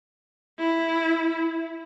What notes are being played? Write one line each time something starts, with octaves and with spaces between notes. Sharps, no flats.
E4